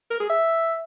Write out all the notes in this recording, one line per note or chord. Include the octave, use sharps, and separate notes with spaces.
A#4
G#4
E5